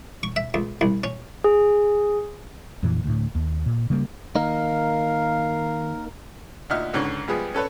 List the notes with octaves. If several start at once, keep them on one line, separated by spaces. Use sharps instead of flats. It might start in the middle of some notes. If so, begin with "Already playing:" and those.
C#6
E5
C#2
C2
C#4
G#4
F2 A#2 E3
D2 A2
D#2
A#2
C#3 G3 A#3
D#3 A#3 D#4 A#4 F5
D2 A#2 D#4 E5 F#5 F6
C#2 G#2 D3 C#4 C#6
F3 G3 G#3 B3 G#4
C#4 A4 B4 C#5